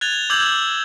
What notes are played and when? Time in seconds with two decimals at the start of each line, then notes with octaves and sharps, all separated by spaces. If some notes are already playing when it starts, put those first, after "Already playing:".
0.01 F#6 G#6 A6 F7 G7
0.30 D6 E6 G6 G#6 F#7